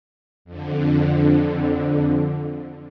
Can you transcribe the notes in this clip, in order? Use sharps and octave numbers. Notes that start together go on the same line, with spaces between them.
F2 D3